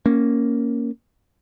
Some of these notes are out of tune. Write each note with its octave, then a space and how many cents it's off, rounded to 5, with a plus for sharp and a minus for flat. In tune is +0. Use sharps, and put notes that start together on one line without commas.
A#3 +0 C#4 +0